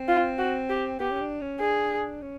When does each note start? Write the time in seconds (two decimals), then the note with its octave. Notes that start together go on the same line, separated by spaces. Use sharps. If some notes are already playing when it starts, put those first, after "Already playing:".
Already playing: C4
0.08 F4
0.38 F#4
0.70 G4
1.00 B3 G4
1.11 C#4
1.21 D4
1.41 C#4
1.60 D4 G#4
2.22 C#4